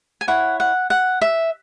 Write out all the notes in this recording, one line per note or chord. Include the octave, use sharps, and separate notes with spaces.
G#5
E4 C#5 F#5
F#5
F#5
E5